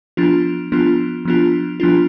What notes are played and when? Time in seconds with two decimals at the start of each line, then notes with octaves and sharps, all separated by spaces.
0.17 F3 B3 D4 F4
0.72 F3 B3 D4 F4
1.25 F3 B3 D4 F4
1.80 F3 B3 D4 F4